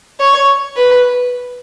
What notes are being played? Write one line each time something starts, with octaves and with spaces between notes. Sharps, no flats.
C#5
B4